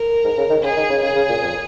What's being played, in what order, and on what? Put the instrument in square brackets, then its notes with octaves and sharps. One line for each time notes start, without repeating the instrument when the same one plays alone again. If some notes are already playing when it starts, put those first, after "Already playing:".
Already playing: [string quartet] A#4
[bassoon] G#2
C#3
D#3
[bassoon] C#3 [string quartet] G#4
[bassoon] D#3
C#3
[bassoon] C#3 [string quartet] G#4
[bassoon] C#3
A#2
F2